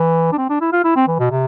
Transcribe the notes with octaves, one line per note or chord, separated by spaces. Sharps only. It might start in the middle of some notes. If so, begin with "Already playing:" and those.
Already playing: E3
D4
C4
D4
E4
F4
E4
C4
E3
B2
C3